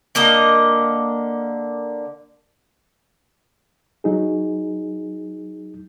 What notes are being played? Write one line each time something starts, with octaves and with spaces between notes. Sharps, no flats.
D3 A#3 A#4 D#5
F#3 D#4 G#4